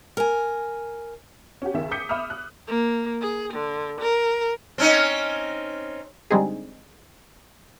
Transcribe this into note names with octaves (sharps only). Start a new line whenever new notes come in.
A#4 G#5
C#4 F#4 G4
C#2 D#3 E5
D6 D#6 G6 B6 C#7
E5 B5 D6 D#6 F6
F#6
A#3
G#4
D3
A#4
C4 C#4 D#4
D3 G3 G#3 C4 D#4 G#4